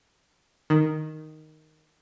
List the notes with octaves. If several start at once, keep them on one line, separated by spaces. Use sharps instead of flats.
D#3